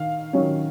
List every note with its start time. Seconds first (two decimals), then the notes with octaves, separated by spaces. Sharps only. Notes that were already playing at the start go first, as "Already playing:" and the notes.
Already playing: D#3 F5
0.33 D#3 F#3 C#4